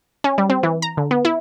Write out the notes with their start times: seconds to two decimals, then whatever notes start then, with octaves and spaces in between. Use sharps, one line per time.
0.24 C#4
0.38 G3
0.50 C4
0.63 E3
0.82 A#5
0.97 D3
1.11 B3
1.25 E4